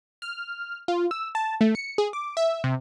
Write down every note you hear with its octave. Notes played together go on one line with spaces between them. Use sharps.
F6
F4
E6
A5
A3
C#7
G#4
D6
E5
C3